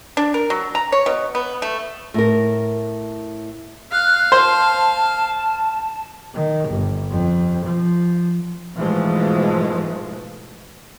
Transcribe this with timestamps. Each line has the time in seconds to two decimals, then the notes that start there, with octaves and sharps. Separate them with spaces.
0.17 D4
0.34 A#4
0.50 F#3
0.75 A#5
0.92 C#5
1.06 B2
1.35 B3
1.62 A3
2.14 A2 A#4
3.92 F5 F#6
4.32 C5 A5
6.34 D#3
6.68 G1
7.10 F2
7.64 F3
8.75 G#2 B2 E3 F3 G#3 A3